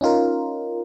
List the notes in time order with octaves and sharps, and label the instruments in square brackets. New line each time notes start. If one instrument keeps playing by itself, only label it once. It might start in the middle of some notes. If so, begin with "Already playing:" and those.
[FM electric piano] C#4 D#4 F4 A#4